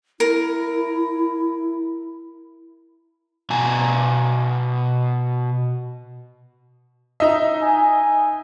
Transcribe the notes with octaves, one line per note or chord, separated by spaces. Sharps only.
E4 A#4
B2 G#5 A#5
D#4 D#5 E5 A#5
G#5